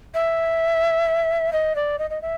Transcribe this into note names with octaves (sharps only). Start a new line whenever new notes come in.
E5
D#5
D5
D#5
D#5
E5